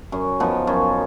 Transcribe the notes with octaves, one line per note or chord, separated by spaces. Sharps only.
F#2
F3 B3 D#4
F#2